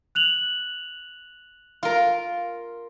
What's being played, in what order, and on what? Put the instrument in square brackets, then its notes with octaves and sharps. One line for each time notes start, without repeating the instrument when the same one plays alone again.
[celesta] F#6 F7 F#7
[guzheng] F4 A#4